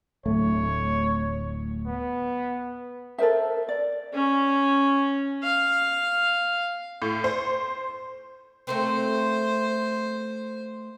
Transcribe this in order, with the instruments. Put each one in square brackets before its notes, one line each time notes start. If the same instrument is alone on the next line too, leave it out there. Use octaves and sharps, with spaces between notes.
[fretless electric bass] D1 A3 [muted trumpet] C#5
[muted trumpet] B3
[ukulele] A4 A#4 C5 E5
D5
[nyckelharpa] C#4
F5
[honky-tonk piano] A2
C5
[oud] A3 A#3 C4 [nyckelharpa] C5